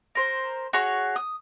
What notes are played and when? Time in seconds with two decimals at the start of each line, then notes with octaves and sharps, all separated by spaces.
0.15 A#4 C5
0.73 F#4 G#4 C#5 C#6
1.16 D#6